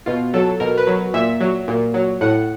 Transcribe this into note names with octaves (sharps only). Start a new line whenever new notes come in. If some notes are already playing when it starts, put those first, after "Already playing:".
B2 F4
F#3 A4
B2 A#4
B4
F#3
A#2 E5
F#3
A#2
F#3
A2 F#5